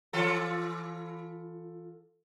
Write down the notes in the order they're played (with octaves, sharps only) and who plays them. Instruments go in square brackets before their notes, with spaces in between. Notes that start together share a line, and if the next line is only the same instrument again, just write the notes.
[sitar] E3 F4 A4